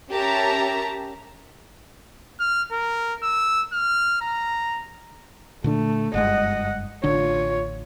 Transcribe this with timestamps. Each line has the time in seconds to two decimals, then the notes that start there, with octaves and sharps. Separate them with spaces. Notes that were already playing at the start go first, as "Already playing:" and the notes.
0.11 C#4 G4 A#4 E5 A5 A#5
2.40 F6
2.72 A#4
3.23 E6
3.72 F6
4.21 A#5
5.64 A#2 D3 A3 D4
6.14 F#1 G2 G#3 D#5 F#5
7.04 A1 D3 D4 F4 C#5